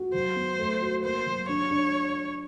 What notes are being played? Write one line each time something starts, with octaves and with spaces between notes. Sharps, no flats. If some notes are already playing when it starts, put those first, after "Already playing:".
Already playing: F#4
F#3 C5
B3
A3
F#4
A#3 C5
F#3
D4 C#5
D4